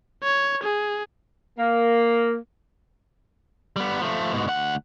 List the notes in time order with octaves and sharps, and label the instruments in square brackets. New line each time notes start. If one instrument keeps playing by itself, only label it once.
[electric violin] C#5
G#4
[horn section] A#3
[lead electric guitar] G3 B3
F3 A3
G#2 B2
D2 F#5